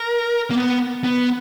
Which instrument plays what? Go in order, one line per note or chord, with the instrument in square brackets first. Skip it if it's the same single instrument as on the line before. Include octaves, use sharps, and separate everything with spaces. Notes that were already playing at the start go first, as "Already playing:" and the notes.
Already playing: [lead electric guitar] A#4
A#3
B3
B3